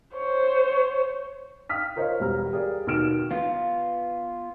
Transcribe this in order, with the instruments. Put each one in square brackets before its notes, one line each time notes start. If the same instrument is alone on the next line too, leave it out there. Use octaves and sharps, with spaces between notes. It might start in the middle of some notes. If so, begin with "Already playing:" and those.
[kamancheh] C5 C#5
[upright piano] F5 G5 D#6 F6 B6
F4 A#4 C5 C#5 D#5 F5
E1 G3 B3 A#5 F6
G4 G#4 A#4 D5 F5
D#2 B2 D#4 F6 D7 E7
[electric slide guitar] B3 F4